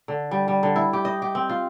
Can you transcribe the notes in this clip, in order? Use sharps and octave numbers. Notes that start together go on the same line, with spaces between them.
D3
G3
G3
D3
E4
G4
D#5
G4
C4
F4